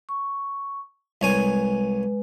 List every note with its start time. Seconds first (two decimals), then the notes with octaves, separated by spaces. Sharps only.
0.09 C#6
1.21 C2 G#3 B4 C#5 G#5